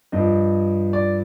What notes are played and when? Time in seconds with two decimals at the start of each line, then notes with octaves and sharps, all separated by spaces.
0.12 G2 F3 D#5
0.93 D5